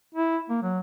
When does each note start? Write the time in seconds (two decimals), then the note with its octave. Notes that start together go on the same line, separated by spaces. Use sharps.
0.15 E4
0.50 A#3
0.63 F#3